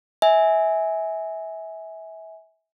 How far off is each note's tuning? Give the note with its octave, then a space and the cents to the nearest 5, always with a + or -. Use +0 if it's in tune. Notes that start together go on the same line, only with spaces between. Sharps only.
E5 -25 G#5 +0